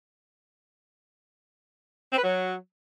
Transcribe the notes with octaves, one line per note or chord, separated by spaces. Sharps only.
C4
B4
F#3